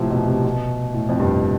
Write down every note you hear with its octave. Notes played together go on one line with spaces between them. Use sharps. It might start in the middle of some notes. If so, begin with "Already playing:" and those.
Already playing: A2 C3 F3
B2
C3
B2
A2
F2
G2